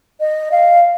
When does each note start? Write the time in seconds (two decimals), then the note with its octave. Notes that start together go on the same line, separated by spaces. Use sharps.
0.20 D#5
0.52 F5